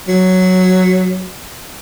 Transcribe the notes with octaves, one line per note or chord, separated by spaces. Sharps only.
F#3